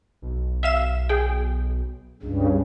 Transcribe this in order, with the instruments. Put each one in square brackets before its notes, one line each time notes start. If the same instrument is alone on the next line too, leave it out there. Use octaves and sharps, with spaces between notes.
[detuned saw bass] B1
[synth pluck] E5 F5 E7
G#4 G5
[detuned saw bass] C#2 [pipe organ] G2 C#3